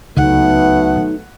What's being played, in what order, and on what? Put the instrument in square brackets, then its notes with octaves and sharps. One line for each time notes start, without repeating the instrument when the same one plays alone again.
[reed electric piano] C#2 [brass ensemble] F#3 A3 B3 [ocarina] D#4 [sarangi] F#5